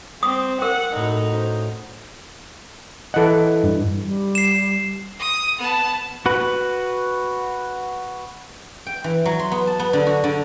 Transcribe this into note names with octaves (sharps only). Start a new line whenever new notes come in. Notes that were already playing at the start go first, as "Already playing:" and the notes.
C4 D#6
A#4 F#5
A2 D#4 F#4
C#4 C5
E3 A4 D#5 F#5
G2
G3
C7 E7
D#6
B3 A5
F#4 B4
G5
E3
F#3
C6
B3
A5
B3
D3
F#4
D3